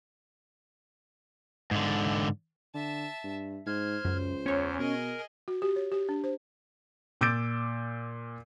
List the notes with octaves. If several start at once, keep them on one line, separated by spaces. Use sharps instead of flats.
G#2 D3
D3 E5 A5
G2
G#2 C5 F6 G#6
C#2 F#2
E2 C#4 C#5
B2 G#4 A#4 D#5
F#4
G4
C#5
G4
D4
C5
A#2 D6 E6 G6 A6 D7